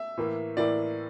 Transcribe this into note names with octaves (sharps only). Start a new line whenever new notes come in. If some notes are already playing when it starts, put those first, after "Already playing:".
Already playing: E5
A2 E3 A#3
A2 E3 A#3 D5